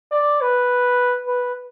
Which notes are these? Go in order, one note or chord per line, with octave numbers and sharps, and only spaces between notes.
D5
B4
B4